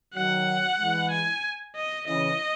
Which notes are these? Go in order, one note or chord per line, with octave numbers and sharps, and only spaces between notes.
D#3 F#3 F#5
E3 G#3
G#5
D#5
C#3 E3 D#5